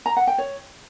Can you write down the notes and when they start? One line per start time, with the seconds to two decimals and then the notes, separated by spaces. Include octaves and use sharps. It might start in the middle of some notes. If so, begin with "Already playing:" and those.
0.06 A#5
0.17 F#5
0.27 G5
0.38 C#5